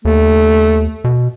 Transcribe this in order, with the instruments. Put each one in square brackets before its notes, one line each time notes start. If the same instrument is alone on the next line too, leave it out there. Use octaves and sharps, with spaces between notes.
[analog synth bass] D#2 [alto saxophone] A3
[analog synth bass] B2